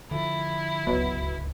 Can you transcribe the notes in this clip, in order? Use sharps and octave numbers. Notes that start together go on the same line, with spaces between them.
D3 F3 E4
D1 G1 C#2 B2 F#3 B3